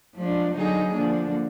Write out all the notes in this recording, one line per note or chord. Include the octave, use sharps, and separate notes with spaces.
F3 G#3 D4
D3 F#3 B3 D#4 G#4
D3 F3 A#3 D4